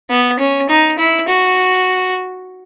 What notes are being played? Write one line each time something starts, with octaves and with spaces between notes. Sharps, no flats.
B3
C#4
D#4
E4
F#4